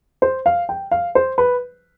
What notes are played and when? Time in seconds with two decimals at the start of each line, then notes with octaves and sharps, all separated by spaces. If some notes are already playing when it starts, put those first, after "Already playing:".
0.22 C5
0.46 F5
0.69 G5
0.91 F5
1.15 C5
1.38 B4